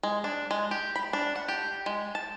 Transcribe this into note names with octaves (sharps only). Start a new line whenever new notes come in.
G#3
D4
G#3
G4
B5
D4
F#5
G4
G#3
A5